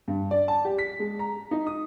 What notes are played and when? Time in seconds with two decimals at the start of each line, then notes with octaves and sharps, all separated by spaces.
0.08 G2
0.31 D5
0.48 A5
0.65 G4
0.78 B6
1.00 G#3
1.19 A#5
1.51 D#4
1.67 D#6